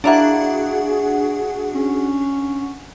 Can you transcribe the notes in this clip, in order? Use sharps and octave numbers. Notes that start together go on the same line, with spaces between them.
A3 A#3 D4 E4 F#4 G#4 F#5
C#4